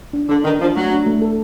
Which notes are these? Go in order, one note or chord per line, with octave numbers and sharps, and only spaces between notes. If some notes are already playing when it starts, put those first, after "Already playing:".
D4
D3 D4
D#3 D4
F3 D4
F#3 A3
D4
A3
A4